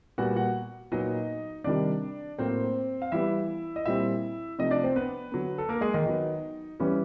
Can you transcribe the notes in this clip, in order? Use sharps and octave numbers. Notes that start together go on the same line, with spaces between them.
A#2 G3 B3 F#4 F#5
F#4 F#5
A#2 F#3 B3 D#4 D#5
C3 D#3 G3 D4 D5
A2 F#3 A#3 C4 C5
F5
E3 G3 B3 E4 E5
D#5
A#2 G3 C4 E4 E5
C3 F3 A3 D#4 D#5
D4 D5
C4 C5
B3 B4
D3 F#3 B3
A4
A#3 A#4
G#3 G#4
D#3 D#4
D#3 F#3 B3
E3 G3 B3 C#4